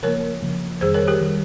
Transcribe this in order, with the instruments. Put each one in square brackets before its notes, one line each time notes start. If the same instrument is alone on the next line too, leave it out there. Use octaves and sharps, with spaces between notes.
[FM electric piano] C#3 F3 A#3 [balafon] A#4 C#5
[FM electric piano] C#3 F3 A#3
[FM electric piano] F2 D#3 G3 [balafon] G#4 C5
[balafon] A#4 C#5
G4 A#4
[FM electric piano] D#3 G3